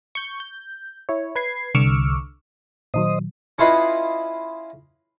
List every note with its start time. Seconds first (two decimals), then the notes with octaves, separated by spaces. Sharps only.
0.15 C#6 G6
0.40 G6
1.09 E4 C#5
1.35 B4 G#6 C7
1.74 C2 D3 C#6 D6 E6 F6
2.94 A#2 D#3 F#3 C5 D#5 D#6
3.59 C#4 E4 F4 B4 D#5